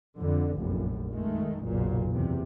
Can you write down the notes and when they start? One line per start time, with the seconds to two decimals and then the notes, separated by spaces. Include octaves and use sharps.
0.17 F2 D3
0.55 F1 A#1 F#2
1.12 D#3 G#3 A3
1.63 F#1 B1 A#2
2.11 E2 C3